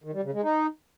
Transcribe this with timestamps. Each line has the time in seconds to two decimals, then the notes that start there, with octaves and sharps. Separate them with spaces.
0.04 D#3
0.14 G3
0.24 C#3
0.33 G#3
0.43 D#4